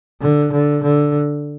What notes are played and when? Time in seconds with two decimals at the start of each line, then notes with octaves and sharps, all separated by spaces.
0.21 D3
0.52 D3
0.83 D3